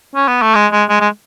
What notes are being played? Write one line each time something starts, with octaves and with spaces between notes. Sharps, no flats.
C#4
B3
A3
G#3
G#3
G#3
G#3